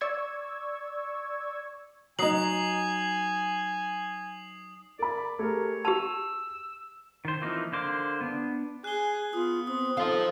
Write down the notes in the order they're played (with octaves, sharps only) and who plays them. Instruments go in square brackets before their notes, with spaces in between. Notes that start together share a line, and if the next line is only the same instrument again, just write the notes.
[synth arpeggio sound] D5 C#6 E6 G#6
[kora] F#3 D#4 [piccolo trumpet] G#5 [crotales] D#6 C7 F#7
[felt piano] A#4 B5 [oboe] D5
[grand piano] A3 G4 A#4 [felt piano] G#4 [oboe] C#5
[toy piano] G4 B4 A5 [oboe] E6 [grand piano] F7
[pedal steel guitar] D#3 C5
E3 F3 A#3 C4 D#4
D3 A#3 C5 D6
B3 D4
[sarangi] G#4 [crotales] F#6 G7
[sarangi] B3 [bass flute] F4 [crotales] D#6
[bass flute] C4 [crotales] D#6
[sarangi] D#4 [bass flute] A4 [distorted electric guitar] C5 F5